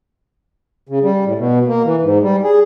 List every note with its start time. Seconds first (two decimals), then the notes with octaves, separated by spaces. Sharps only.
0.89 C#3
1.03 G3
1.25 A2
1.38 B2
1.67 A#3
1.85 E3
2.02 G#2
2.22 G3
2.44 G#4